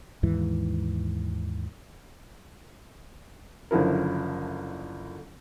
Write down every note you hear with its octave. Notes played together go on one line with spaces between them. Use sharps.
D#2 G#2 E3
F#1 D3 F3 E4 A#4